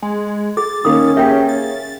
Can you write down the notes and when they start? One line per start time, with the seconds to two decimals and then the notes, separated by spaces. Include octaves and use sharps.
0.02 G#3
0.57 G#4 A6
0.85 D#3 A#3 C#4 D#6
1.17 A#3 G4 G#4 E5 G5
1.49 A6